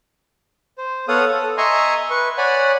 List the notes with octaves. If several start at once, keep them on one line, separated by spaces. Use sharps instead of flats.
C5
B3 A4 C#5 F5 F#5 D#6
A4
D#5 E5 G#5 A#5 C6 C#6
B4 C#6
C#5 D5 F#5 G#5 B5